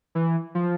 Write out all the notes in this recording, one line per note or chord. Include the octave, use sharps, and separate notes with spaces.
E3
F3